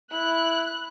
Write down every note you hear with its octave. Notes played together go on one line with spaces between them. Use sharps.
E4 F#6